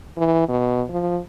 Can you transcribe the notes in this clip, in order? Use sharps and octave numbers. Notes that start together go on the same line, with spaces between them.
E3
B2
F3